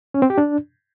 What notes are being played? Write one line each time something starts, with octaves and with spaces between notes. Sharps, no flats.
C#4
C4
G4
D4